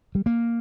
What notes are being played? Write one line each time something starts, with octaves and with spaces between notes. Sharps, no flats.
G3
A#3